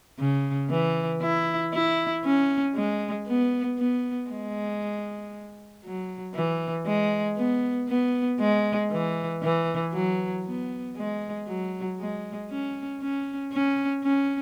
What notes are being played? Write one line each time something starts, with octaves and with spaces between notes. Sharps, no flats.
C#3
E3
E4
E4
C#4
G#3
B3
B3
G#3
F#3
E3
G#3
B3
B3
G#3
E3
E3
F#3
B3
G#3
F#3
G#3
C#4
C#4
C#4
C#4